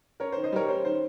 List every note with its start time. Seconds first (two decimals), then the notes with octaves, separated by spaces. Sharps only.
0.20 C#4 A#4 C#5
0.32 C5
0.36 D#3
0.44 C5 D#5
0.52 G3 A#4 C#5
0.68 C#4 C5
0.85 D#3 C5